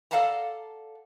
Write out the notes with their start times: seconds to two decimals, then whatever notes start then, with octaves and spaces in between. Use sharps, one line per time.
0.11 A4 D5 F5 F#5 A5 A#5